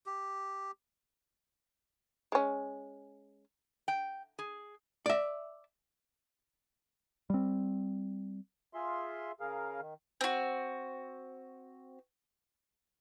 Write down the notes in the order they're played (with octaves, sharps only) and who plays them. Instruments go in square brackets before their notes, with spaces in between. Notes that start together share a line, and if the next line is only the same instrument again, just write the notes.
[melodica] G4
[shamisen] G#3 C#4
[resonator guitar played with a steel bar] G5
G#4
[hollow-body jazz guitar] D5 E5
[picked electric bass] G3 C4
[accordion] F4 G#4 E5 C6
C#3 G#4 A#4 F5
D#3
[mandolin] C4 F#4